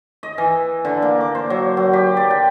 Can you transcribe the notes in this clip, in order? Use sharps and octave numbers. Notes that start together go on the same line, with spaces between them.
D#5
E3
D3
A#3
D6
C5
F#3
F#3
G4
D5
G5